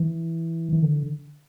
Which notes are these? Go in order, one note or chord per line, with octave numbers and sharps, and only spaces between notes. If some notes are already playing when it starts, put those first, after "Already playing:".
Already playing: E3
E3
D3